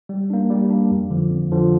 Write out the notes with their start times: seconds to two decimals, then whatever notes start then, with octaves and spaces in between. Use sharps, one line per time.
0.09 G3
0.30 A#3 D4
0.50 G3
0.70 A#3 D4
0.91 F2
1.10 D3 F3
1.30 F2
1.52 D3 F3